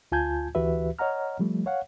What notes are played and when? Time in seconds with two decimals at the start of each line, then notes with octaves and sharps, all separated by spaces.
0.12 D2 F4 G#5 A5 G6 G#6
0.55 D2 E3 F#4 G4 B4 E5
0.99 C#5 D#5 F#5 A#5 F6
1.39 F3 G3 A3
1.66 C#5 F5 F#5